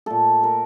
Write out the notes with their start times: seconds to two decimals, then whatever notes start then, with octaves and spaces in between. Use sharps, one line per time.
0.06 A#2 A3 A4
0.43 A#4